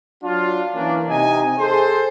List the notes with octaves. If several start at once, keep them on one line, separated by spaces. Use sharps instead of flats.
F#3 D4 F4
E3 A#3 C#4 D4
C3 D#4 D#5 G#5
G#4 A4 C5